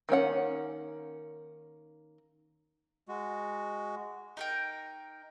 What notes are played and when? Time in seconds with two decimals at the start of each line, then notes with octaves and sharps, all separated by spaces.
0.09 D#3 A#3 C#4 F#5
3.08 G#3 F#4
4.37 D#4 A#4 G5